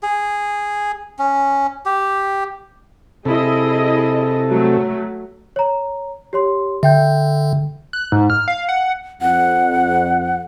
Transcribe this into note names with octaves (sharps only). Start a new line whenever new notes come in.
G#4
C#4
G4
C3 E4 G#4 A4 D#5
F#3 A3
C#5 A#5
G4 C#5 C6
D3 E5 G5 G6
F#6
G#2
F6
F5
F#5
F2 F#5